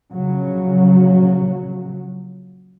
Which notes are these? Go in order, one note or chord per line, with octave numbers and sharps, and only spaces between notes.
A#1 C#3 F#3